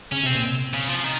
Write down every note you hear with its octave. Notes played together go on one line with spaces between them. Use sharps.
C#3 C#4
C3
C4
A#2
C3
C#3
F3
D#3